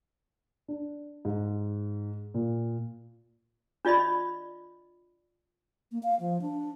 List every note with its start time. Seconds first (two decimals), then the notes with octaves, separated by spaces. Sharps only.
0.68 D4
1.25 G#2
2.34 A#2
3.85 D4 F4 D5 D#5 B5
5.92 A#3
6.03 F5
6.20 F3
6.41 D4